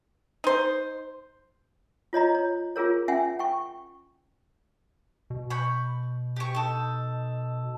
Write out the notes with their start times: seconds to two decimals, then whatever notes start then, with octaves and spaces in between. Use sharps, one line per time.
0.44 D#4 C5
2.13 F4 C#5 D#5 A#5
2.35 C#5
2.76 F4 G#4 A#4 C#5
3.08 C#4 E5 F#5 G#5
3.39 G5 C#6
5.30 B2
5.50 B5 C#6 G6
6.36 G4 C#6
6.55 D#4 A4